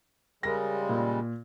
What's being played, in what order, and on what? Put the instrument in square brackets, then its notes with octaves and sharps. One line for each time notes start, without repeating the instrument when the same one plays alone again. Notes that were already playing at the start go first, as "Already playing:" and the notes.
[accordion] C#3 G3 G#3 [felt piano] A#4 A#6
[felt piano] A#2